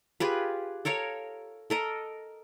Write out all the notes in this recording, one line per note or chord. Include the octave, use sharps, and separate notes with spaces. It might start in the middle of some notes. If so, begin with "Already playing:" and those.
F4 G4 G#4 B4
A4 A#4 C#5 F5
A4 A#4 D#5